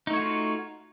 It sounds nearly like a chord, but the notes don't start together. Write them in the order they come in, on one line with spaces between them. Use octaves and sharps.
D#4 A3 C#5 F#4 F4